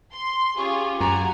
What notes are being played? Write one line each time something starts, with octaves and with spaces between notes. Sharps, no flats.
C6
C#4 F4 G4 G#4 C#6
F#2 F#5 G#5 A#5